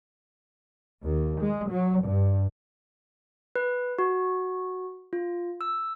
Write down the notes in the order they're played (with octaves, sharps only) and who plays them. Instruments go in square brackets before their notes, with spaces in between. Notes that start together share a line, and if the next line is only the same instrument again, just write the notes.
[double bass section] D#2
G#3
F#3
G2
[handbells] B4
F#4
F4
E6